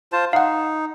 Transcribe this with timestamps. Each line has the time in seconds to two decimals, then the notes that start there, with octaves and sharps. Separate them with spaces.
0.12 F4 C5 A5
0.33 D#4 F5 F#5